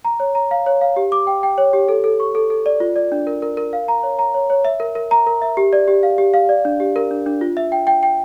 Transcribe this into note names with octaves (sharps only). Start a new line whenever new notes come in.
A#5
C#5
A#5
F5
C#5
F5
G4
D6
G5
G5
C#5
G4
A4
A4
C#6
A4
A4
D5
F4
D5
D4
A#4
A#4
A#4
F5
A#5
C#5
A#5
C#5
C#5
E5
A#4
A#4
A#5
A#4
E5
G4
D5
G4
F5
G4
F5
D5
D4
G4
A#4
D4
D4
F4
E5
G5
G5
G5